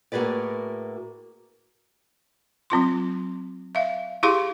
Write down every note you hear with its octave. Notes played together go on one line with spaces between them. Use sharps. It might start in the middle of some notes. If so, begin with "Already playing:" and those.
A2 A#3 F#4 G#4 B4 D5
F#3 C4 F4 C6
E5 F5
E4 G4 G#4 F5 C6 C#6